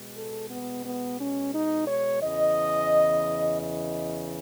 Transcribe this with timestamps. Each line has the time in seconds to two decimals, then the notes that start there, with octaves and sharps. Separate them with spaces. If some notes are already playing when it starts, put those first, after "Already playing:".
Already playing: B2 G#3
0.15 A4
0.50 B3
0.85 B3
1.19 C#4
1.54 D#4
1.88 C#5
2.21 E2 C#3 E3 D#5
3.60 D#5